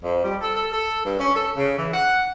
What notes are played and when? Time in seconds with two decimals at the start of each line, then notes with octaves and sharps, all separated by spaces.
0.03 F2
0.24 G3
0.41 A4
0.55 A4
0.72 A4
1.04 G2
1.20 C#4
1.35 A4
1.57 C#3
1.77 E3
1.93 F#5